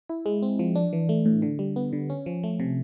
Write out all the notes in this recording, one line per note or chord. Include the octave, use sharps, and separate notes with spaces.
E4
G#3
C4
F3
D4
E3
A3
A2
D3
G3
B3
D3
C#4
F3
A3
C3